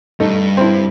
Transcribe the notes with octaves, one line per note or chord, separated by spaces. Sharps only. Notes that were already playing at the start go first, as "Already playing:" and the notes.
G2 A3 D#4
C4 E4